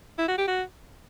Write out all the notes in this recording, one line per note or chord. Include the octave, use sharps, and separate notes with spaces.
E4
F#4
G4
F#4